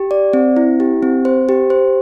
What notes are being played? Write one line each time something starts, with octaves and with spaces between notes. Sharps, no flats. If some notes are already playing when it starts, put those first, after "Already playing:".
Already playing: G4
D5
C4
E4
G4
C4
C5
G4
C5